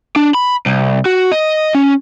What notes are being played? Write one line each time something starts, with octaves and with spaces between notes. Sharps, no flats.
D4
B5
C2
F#4
D#5
C#4